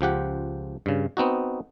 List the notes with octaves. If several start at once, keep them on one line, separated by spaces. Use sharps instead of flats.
C#2 F3 G4 F#5
G2 C#3
B3 C4 D#4 F#4